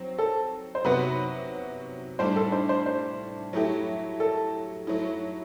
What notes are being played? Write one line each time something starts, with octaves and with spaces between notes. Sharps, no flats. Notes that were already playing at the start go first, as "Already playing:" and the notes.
Already playing: F#3 C4
A4
C5
C3 F#3 B3 F#4 B4
A2 G3 D4 C5
A4
C5
C5
C5
F#3 A3 E4 G4
A4
F#3 A3 E4